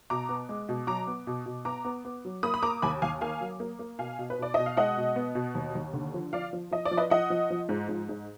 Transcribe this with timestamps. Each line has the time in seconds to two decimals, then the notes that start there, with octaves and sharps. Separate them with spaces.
0.10 B2 A#5 D6
0.29 B3
0.49 G#3
0.69 B2
0.87 F#3 A#5 D6
1.07 B3
1.27 B2
1.46 B2
1.65 B3 A#5 D6
1.85 B3
2.05 B3
2.25 F#3
2.43 A#3 B5 D#6
2.54 B5
2.62 A#3 A#5 D6
2.82 D#2 G#5 B5
3.02 D#2 F5 G#5
3.21 A#3 F5 G#5
3.41 F#3
3.60 A#3
3.79 A#3
3.99 B2 F5 G#5
4.19 B2
4.30 B4
4.39 B2 D5
4.54 B2 D#5
4.66 F5
4.77 G#3 D#5 F#5
4.97 B2
5.16 B3
5.35 B2
5.55 D#2
5.75 D#2
5.93 D3
6.14 F3
6.33 F3 D5 F5
6.53 F3
6.71 F3 D#5
6.85 D5
6.91 F3
6.97 B4 D#5
7.10 F3 D#5 F#5
7.30 F3
7.50 F3
7.69 G#2
7.89 G#2
8.09 G#2